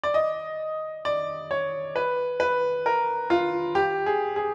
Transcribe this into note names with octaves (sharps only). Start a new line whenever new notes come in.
D5
D#5
D5
C#5
B4
B4
A#4
F4
G4
G#4
G#4